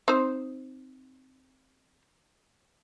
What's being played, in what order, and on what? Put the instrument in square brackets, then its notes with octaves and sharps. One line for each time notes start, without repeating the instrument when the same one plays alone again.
[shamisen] C4 D#4 C5